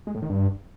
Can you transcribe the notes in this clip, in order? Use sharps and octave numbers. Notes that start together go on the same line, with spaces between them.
G#3
A2
D#3
G2